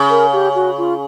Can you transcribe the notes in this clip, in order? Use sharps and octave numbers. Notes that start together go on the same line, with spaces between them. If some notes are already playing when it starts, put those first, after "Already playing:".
Already playing: C#3
A#4
G4
F#4
F4